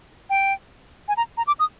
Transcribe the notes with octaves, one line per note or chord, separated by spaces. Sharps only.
G5
G#5
A#5
A#5
D6
D#6